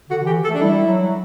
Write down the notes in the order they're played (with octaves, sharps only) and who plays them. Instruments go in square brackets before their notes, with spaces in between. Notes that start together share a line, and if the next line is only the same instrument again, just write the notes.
[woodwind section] D3 [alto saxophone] F#4
[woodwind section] E3 [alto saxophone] G4
[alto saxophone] A4
[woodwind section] A3
[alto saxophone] D4
[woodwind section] G3 [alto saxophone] E4
[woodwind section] F#3